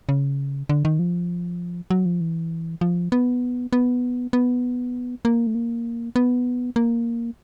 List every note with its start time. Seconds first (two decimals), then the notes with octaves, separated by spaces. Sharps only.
0.09 C#3
0.69 D3
0.85 D#3
0.99 F3
1.90 F#3
2.06 F3
2.21 E3
2.81 F3
3.12 B3
3.73 B3
4.33 B3
5.25 A#3
5.47 A3
5.55 A#3
6.16 B3
6.76 A#3